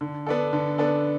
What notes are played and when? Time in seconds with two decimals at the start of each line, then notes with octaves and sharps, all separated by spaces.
0.01 D3
0.27 B3 D4 A4
0.53 D3
0.78 B3 D4 A4